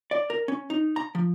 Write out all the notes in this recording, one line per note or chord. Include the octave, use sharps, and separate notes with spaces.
D5
A#4
C#4
D#4
A#5
F3